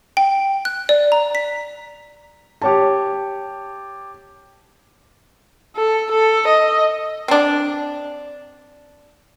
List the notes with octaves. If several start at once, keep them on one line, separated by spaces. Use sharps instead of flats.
G5
F#6
D5
A#5
B6
G4 C#5 A5
A4
A4
D#5
C4 D4